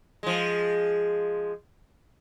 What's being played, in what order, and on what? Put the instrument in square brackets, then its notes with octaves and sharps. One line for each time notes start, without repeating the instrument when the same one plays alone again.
[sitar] F3 G#3